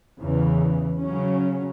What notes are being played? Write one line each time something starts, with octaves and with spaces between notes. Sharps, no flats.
E2 C#3 E3
C#3 F#3 C#4